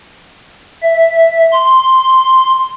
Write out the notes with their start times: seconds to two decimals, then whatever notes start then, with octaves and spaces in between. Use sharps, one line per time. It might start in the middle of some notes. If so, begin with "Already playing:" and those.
0.83 E5
1.52 C6